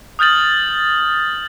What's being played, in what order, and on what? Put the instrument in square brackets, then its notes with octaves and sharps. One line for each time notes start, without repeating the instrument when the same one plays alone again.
[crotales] D#6 F6 G6 A6 F#7